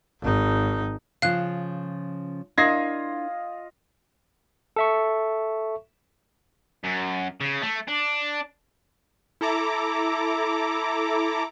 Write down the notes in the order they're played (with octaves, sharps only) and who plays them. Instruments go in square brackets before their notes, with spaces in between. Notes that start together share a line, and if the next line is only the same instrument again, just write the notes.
[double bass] G#1 D#4
[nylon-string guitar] C#3 F3 [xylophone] F5 F#6
[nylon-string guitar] D4 E4 A#4 [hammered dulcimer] F4 D#5 [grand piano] G#6 A#6 C7
[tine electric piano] A4 E5 C#6
[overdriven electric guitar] F#2
C#3
A3
D4
[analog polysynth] E4 A4 A#5 D6